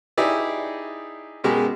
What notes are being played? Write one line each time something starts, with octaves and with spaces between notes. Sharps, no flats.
D#4 E4 G4 G#4 D5
F#2 B2 G#3 G4 G#4 A#4